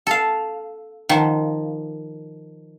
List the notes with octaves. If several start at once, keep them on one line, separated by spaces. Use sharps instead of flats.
A4 F5
D#3 F3